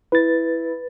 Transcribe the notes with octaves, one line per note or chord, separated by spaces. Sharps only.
E4 B4 A6